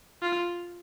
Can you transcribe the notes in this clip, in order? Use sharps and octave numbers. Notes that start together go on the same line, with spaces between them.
F4